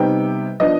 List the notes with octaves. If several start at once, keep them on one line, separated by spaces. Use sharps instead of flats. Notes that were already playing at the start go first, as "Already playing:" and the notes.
Already playing: C3 G3 B3 D#4 G5
F3 B3 D4 D#5